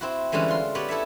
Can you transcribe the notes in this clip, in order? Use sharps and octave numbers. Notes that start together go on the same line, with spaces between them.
C4 E4 F#4
D3 E3 G3 G#3 C#4
F4 C6
B3 G4 C#5 D5
E4 A4 C#5 E5